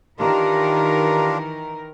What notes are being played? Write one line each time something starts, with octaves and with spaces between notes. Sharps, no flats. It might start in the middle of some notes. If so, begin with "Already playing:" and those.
D#3 E3 D4 F4 G4 A#4